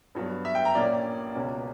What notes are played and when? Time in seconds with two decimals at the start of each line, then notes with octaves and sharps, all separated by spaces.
0.15 G2 F#3 B3
0.45 E5
0.55 G5
0.65 A#5
0.75 A#1 A#2 A#3 C#4 D5
1.35 C#2 B2 A#3 C#4